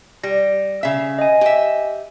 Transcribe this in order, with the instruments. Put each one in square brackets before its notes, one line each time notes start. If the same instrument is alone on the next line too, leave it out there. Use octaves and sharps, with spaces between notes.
[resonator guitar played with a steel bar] G3 [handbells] A#6
[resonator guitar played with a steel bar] C#3 E5
[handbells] D#5 G#5
[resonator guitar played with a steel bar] G4 E5